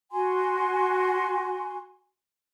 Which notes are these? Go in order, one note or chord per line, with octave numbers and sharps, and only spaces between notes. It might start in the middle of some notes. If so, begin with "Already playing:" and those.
F#4 G#5 C6